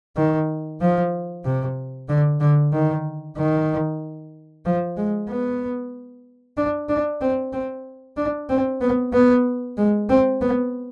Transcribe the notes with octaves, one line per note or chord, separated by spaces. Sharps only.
D#3
F3
C3
D3
D3
D#3
D#3
F3
G#3
B3
D4
D4
C4
C4
D4
C4
B3
B3
G#3
C4
B3